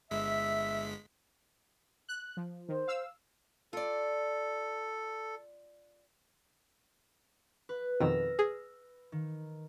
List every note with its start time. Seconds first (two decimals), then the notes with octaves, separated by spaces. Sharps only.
0.11 G1 G#3 E5 B6
2.09 F#6
2.37 F3
2.69 D#3 C5
2.88 F5 E6
3.73 F4 A4 D5
7.69 B4
8.00 F2 B2 D#3 E6 F6 A#6
8.39 G#4
9.12 D#3